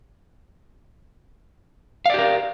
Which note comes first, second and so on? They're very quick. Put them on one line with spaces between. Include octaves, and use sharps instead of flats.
F5 D5 G4 A#4